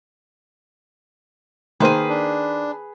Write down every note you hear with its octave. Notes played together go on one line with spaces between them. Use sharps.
D#3 A#3 G#4 B4 C5
D4